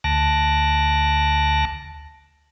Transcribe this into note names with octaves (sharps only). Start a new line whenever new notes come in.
D2 A5 D6 F#6 A#6